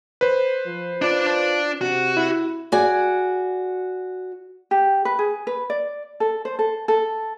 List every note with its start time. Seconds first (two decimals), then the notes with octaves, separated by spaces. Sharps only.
0.21 B4 C5
0.66 F3
1.02 D4 F4 D5
1.81 C3 F#4
2.17 E4
2.72 F#4 G#4 D5 G#5
4.71 G4
5.05 B4
5.19 G#4
5.47 B4
5.70 D5
6.20 A4
6.45 C5
6.59 A4
6.88 A4